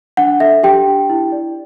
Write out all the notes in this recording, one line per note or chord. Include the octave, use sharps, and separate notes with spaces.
D4 F#5
A4 E5
D4 G4 G5
D4
E4
D5